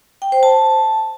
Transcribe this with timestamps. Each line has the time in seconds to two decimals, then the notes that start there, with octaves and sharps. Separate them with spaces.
0.22 G5
0.32 C5
0.43 A5